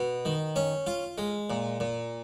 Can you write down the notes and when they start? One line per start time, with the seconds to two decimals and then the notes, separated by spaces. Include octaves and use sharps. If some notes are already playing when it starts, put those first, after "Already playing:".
Already playing: B2
0.25 D#3
0.56 C#4
0.87 F4
1.18 G#3
1.50 A#2
1.80 A#2